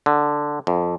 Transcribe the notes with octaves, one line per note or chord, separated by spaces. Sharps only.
D3
F2